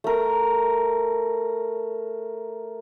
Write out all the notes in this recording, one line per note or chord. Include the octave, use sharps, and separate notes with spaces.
A3 A#4